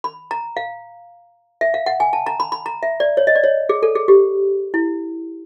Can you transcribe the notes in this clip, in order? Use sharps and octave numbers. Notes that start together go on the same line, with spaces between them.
B5
A#5
F5
E5
F5
F#5
G#5
A5
A#5
B5
B5
A#5
E5
D5
C#5
D#5
D5
C#5
G#4
A4
G#4
G4
E4